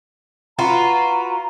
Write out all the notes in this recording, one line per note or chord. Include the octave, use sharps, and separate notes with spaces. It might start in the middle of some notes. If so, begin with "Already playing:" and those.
F4 F#4 B4 A#5